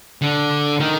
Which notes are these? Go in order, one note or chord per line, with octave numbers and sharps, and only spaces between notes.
D3
D#3